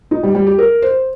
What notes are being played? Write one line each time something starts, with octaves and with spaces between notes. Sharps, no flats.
D#4
G3
G3
G4
A#4
C5